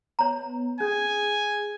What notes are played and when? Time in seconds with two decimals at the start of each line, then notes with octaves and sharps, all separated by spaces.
0.19 B3 C#5 A#5
0.80 C#4 G#4 G#5